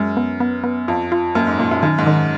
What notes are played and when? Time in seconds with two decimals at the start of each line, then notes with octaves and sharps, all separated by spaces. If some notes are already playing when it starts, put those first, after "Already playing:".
Already playing: F#2 G#3
0.17 B3
0.40 B3
0.64 B3
0.88 F2 F4
1.12 F4
1.35 F#2 A#3
1.47 G#2
1.59 A#2 A#3
1.71 F#2
1.83 F#2 D#3
1.98 G#2
2.06 D#3